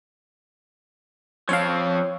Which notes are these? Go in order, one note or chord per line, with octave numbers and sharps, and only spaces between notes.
F3 C4 C#5 F5